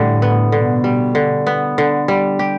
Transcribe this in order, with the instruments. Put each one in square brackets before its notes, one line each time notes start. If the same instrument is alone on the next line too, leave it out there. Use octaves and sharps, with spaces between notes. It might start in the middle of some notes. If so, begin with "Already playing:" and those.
Already playing: [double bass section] A2 [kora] D3 G3
[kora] B3
[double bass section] B2 [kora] D3
[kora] G3
D3
B3
D3
G3
G4